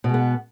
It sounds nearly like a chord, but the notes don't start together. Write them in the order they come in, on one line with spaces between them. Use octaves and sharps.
B2 G#3 B3